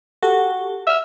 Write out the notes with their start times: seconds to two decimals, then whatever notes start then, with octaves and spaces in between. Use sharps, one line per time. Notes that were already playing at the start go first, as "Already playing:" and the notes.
0.23 F#4 G4 A4
0.87 E5 E6 F6